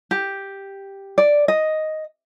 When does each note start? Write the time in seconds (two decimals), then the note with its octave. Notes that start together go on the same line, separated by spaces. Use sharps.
0.11 G4
1.18 D5
1.48 D#5